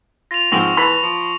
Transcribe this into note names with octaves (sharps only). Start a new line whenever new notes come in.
F4 A#6 F7
G#2 F3 C4 C#6 A#6 F#7
E3 A5 B5
F3